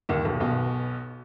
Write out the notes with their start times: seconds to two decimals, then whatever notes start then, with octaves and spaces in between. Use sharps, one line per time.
0.09 D#2 D#3
0.25 B1 B2
0.40 B1 B2